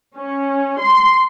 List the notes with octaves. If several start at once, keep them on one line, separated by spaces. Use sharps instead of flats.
C#4
C6